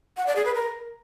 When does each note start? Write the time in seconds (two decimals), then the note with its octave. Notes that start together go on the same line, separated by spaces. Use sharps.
0.17 F#5
0.27 D5
0.36 G#4
0.45 B4
0.55 A#4